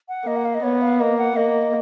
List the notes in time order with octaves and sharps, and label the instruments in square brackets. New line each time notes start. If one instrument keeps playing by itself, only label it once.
[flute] F#5
[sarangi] A#3 [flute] D#5
[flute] F#5
F5
D#5
[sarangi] B3 [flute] C#5
[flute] F5
[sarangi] A#3 [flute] D#5
[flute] F#5
[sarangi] A#3 [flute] D#5